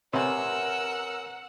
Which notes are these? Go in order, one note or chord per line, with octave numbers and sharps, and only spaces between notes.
C3 A#4 B4 C#5 F#5 G#5 E6